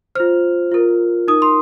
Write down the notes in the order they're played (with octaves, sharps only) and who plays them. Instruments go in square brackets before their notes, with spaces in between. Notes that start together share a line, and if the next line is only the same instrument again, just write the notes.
[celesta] F4 C5 F6
F4 A#4
D#4 A#4 D#6
C6